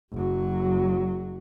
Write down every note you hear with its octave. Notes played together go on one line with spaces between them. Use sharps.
F#1 F#3